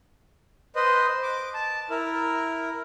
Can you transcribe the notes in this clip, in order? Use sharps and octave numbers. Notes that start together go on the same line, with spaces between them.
B4 C5 D#5
D6
A5
E4 A#4